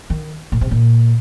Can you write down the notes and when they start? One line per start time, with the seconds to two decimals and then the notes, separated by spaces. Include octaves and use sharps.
0.10 D#3
0.52 A#2
0.61 C3
0.71 A#2